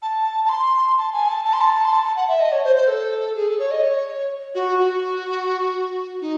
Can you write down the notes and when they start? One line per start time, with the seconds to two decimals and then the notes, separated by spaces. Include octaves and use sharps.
0.02 A5
0.45 A5
0.50 C6
0.98 A5
1.13 G#5
1.29 A5
1.45 A5
1.53 C6
1.61 A5
1.85 C6
1.92 A5
2.04 A5
2.16 F#5
2.28 E5
2.40 D#5
2.52 C#5
2.64 C5
2.76 C5
2.88 A4
3.36 G#4
3.48 A4
3.59 C#5
3.71 D#5
3.83 C#5
4.55 F#4
4.78 F#4
6.21 D#4